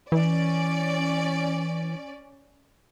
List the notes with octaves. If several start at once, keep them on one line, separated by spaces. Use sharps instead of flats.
E3 C#4 D5